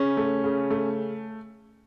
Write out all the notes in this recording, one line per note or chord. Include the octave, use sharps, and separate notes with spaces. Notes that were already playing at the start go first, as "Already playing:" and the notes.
Already playing: C#3 C#4
A3
C#3
A3